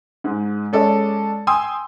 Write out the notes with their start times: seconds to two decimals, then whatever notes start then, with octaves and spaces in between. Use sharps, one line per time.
0.24 G#2 G#3
0.73 G#3 C#4 A4 D5
1.47 G5 G#5 C6 D#6 E6